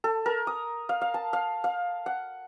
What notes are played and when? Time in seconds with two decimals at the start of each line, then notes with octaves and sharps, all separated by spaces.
0.04 A4
0.26 A#4
0.47 D#6
0.89 F5
1.01 F5
1.14 A5
1.33 F5
1.64 F5
2.06 F#5